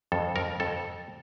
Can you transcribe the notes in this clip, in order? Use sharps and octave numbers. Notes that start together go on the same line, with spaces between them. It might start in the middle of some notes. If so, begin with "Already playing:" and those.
F2 A4
F2 A#4
F2 A4